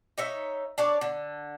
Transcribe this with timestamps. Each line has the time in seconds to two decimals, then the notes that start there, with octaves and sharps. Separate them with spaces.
0.18 D#4 C#5 E5
0.78 D4 C#5 D5
1.01 D3